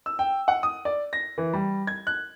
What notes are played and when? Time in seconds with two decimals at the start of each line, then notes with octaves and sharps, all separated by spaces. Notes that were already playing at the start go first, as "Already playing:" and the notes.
0.06 E6
0.19 G5
0.48 F#5
0.63 D#6
0.85 D5
1.13 A#6
1.38 E3
1.53 G3
1.87 G#6
2.07 F#6